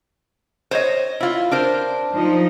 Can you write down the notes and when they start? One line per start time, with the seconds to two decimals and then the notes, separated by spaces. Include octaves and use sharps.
0.71 C5 C#5 D#5
1.20 E4 F4
1.51 D4 A#4 C5
2.12 F3 D#4